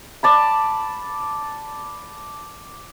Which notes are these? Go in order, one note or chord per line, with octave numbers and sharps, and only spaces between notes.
D5 A5 B5